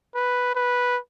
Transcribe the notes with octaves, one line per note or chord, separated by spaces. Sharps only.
B4
B4